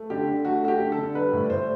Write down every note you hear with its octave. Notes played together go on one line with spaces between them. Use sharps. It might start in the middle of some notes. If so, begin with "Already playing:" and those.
Already playing: A3
D3 G4
D3
A3 F#4
A3 F#4
G4
D3
A4
D3
G3 B4
A2
D5
A2 C5